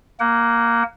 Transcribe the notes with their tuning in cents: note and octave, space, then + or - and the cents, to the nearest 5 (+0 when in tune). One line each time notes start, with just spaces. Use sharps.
A#3 +0 F#5 +35